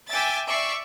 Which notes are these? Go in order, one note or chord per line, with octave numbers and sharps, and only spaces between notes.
E5 G5 G#5 D6 A6 B6
D5 E5 C#6 C7